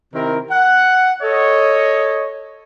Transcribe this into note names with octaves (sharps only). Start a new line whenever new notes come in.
C3 D#3 C4 E4 A#4
F#5
A4 C#5 D#5